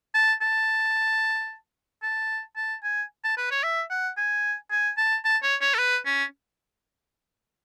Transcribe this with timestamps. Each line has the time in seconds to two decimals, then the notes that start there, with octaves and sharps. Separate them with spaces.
0.14 A5
0.41 A5
2.03 A5
2.56 A5
2.83 G#5
3.24 A5
3.37 B4
3.51 C#5
3.63 E5
3.90 F#5
4.17 G#5
4.71 G#5
4.97 A5
5.25 A5
5.43 C#5
5.61 C#5
5.74 A4
5.78 B4
6.05 C#4